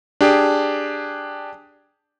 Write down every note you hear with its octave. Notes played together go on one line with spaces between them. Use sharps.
D4 G4 G#4